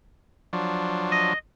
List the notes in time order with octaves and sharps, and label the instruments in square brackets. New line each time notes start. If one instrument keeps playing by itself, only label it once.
[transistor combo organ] F3 F#3 D4
[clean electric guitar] D#5